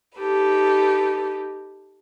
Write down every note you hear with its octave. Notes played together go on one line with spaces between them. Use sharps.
D#4 G4 A4 B4